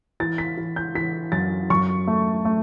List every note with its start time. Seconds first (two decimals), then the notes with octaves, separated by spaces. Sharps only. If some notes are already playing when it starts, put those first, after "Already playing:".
0.20 E3 A6
0.38 B6
0.57 E3
0.76 G6
0.95 E3 B6
1.32 F#2 A6
1.70 F#2 C#6
2.07 A3
2.45 A3